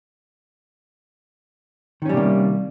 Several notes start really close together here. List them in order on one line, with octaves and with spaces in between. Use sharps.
D#3 C#4 G3 C3 A#3